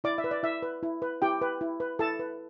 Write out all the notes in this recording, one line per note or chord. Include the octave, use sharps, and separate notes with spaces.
E4 D5 D6
E5
B4
D5
E4 E5
B4
E4
B4
E4 G4 G5
B4
E4
B4
E4 A4 A5
B4